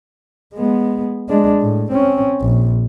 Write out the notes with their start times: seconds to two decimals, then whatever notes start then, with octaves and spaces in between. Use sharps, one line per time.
0.54 G#3 B3
1.29 G#3 D4
1.62 A2
1.91 C4 C#4
2.41 A#1